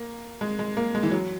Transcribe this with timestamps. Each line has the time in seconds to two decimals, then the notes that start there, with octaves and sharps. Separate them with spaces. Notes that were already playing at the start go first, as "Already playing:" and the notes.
Already playing: A#3
0.41 G#3
0.59 G#3
0.77 A#3
0.95 G#3
1.03 E3
1.11 F#3